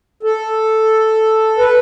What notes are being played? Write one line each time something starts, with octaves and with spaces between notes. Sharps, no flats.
A4
B4